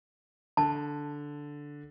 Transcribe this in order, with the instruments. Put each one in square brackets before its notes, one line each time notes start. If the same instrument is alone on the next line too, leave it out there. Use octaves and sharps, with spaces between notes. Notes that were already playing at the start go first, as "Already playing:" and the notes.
[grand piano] D3 [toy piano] A5